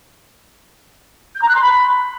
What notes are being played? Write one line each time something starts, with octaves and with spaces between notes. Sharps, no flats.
G6
A#5
F#6
C6
B5